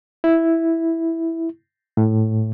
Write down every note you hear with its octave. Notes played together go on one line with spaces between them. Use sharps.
E4
A2